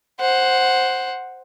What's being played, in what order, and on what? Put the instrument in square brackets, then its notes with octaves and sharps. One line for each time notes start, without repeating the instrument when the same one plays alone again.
[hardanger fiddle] C5 F#5